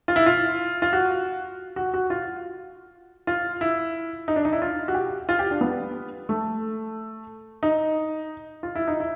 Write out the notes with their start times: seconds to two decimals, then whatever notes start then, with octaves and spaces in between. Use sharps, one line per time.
0.08 F4
0.16 E4
0.26 F4
0.82 F4
0.93 F#4
1.76 F#4
1.94 F#4
2.10 F4
3.27 F4
3.61 E4
4.28 D#4
4.36 D4
4.45 D#4
4.52 E4
4.62 F4
4.88 F#4
4.94 G4
5.29 F4
5.39 G4
5.51 D4
5.61 B3
6.29 A3
7.63 D#4
8.63 F4
8.75 E4
8.88 D#4
9.00 E4